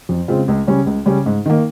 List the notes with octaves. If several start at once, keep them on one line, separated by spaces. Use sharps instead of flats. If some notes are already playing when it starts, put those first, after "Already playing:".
F2
C#3 G#3 C4 F4
C#2
C#3 G3 C#4
C#2
C#3 G3 C#4
G#2
D#3 A#3